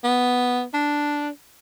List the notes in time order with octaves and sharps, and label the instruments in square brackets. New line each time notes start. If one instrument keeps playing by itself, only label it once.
[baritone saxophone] B3
D4